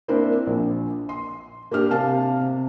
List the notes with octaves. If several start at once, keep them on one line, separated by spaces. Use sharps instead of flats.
A#3 C4 D4 E4 A#4 C5
A#1
C6
A#3 D4 G4 F6
C3 F5 A5
C3